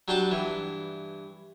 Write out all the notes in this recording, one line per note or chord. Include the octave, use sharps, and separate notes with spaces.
F#3 G3 D4 G4 A5 D6
G2 E3